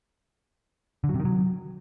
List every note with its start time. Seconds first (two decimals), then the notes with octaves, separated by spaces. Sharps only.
1.04 D3
1.09 F#3
1.14 C3
1.20 D#3
1.25 F#3